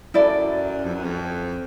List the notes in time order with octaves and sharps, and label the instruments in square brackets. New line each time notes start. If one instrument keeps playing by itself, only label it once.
[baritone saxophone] F#2 [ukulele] E4 A4 D5
[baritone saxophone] F2
F#2
F2